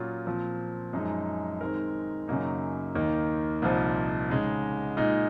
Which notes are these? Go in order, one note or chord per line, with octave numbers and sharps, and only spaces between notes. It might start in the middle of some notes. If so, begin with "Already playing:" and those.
Already playing: A#2 F#3 C#4 F4
A#2 F3 C4
F#2 F3 G#3 D#4
D#3 G#3 C4 D#4 A#4
F#2 C#3 F#3 A#3 D#4
D#2 D#3 A#3 D#4
C2 A#2 F3 C4 D#4
C#3 G#3 D#4
A#2 G#3 D#4